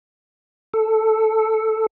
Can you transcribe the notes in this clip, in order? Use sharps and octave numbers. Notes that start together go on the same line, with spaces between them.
A4